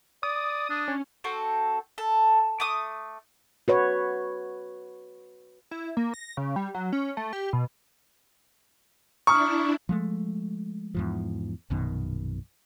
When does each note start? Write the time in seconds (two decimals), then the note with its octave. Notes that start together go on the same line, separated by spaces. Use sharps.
0.23 D5 D#6
0.70 D4
0.88 C#4
1.24 C4 F#4 A4
1.98 A4
2.60 A3 D6 D#6
3.68 F#4 B4 C#5
5.71 E4
5.97 A#3
6.14 A#6
6.37 C#3
6.56 G3
6.74 F#3
6.93 C#4
7.17 A3
7.33 G4
7.53 B2
9.27 D4 E4 A#5 C#6 D#6 F6
9.89 F3 G#3 A3
10.95 E2 G#2 F3
11.70 A#1 F#2 B2 D#3